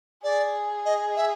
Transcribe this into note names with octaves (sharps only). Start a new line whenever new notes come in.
G#4 D5
D#5
E5